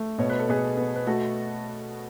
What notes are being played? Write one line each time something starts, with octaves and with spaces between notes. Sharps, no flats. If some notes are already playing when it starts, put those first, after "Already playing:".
Already playing: A3
B2 C#5
B4
A4
B2 G#4 B4
B3
B4
A3 F#4 A4